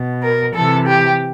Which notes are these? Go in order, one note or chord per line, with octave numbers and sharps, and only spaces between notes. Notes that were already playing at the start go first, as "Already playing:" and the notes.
Already playing: B2
A#4
C3 E3 A4
G4